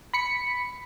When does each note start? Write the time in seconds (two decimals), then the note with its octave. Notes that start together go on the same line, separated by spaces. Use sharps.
0.14 B5 B6 C#7